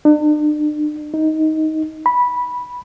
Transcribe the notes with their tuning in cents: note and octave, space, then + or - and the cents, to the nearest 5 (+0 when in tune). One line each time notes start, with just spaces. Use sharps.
D4 +40
D#4 +10
B5 -10